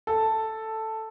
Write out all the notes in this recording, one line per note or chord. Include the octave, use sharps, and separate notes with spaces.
A4